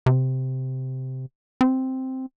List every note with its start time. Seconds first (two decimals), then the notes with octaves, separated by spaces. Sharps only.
0.06 C3
1.61 C4